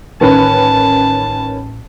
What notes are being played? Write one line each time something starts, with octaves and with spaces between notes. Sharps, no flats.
A1 D#3 C#4 B4 A5